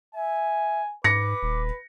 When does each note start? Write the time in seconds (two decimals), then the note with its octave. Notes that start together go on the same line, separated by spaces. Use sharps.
0.15 E5 G#5
1.04 G#2 B4 D6 A#6 C#7
1.43 D#1